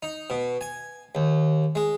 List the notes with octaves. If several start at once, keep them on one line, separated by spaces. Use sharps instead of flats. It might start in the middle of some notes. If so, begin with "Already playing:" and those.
D#4
B2
G#5
D#2
G#3